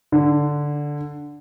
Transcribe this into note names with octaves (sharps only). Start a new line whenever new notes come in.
D3